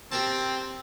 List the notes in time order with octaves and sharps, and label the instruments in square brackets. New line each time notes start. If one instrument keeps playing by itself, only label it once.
[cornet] C4 [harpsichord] G4 A#4 A5